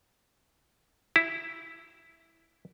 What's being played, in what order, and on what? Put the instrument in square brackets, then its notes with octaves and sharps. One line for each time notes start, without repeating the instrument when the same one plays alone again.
[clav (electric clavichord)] E4